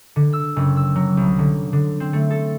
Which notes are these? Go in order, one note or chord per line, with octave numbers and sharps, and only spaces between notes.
D3
E6
F#1
E6
F#3
C2
D3
D3
C4
A3
A4